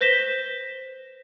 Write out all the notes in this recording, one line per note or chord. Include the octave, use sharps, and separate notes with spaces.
B4 C5 A#6 B6 E7 G7